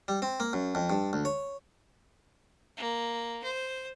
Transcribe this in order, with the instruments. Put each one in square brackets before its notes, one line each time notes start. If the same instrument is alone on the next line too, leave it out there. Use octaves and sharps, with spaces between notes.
[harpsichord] G3
C4
A#3
F#2
F2
G2
D2
C#5
[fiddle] A#3
C5